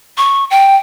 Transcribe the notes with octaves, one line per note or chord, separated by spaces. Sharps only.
C#6
G5